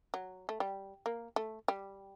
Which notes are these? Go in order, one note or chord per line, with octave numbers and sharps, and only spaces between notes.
F#3
A3
G3
A#3
A3
G3